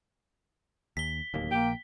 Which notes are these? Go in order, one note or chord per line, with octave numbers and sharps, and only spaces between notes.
D#2 B6 G7
D1 D#2 A#3
A#1 A#3 G5